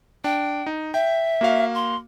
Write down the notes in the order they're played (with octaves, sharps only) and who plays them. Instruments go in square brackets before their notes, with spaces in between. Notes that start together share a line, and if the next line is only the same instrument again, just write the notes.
[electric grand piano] D4 [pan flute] G5
[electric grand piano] D#4
[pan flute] E5 [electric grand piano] G5
[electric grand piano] A#3 F#4 F5
[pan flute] C6